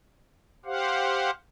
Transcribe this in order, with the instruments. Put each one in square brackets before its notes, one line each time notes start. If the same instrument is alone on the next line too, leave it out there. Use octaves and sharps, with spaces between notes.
[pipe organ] G4 C5 F5 F#5